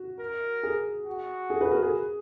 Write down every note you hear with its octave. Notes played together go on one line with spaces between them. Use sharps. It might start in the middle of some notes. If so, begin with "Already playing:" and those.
Already playing: F#4
A#4
G#4
F#4
G#4
G#4 B4
F#4 A#4
G#4